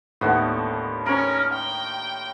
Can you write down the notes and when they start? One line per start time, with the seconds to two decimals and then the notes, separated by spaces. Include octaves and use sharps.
0.21 D#2 A2 D3 B3
1.06 C#4 A#4 C#5
1.53 G5